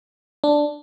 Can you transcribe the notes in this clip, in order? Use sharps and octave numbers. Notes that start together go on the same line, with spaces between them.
D4